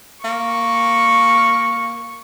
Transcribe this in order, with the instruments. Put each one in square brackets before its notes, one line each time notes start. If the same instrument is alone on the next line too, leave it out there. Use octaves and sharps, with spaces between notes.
[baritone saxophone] A#3 [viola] C#6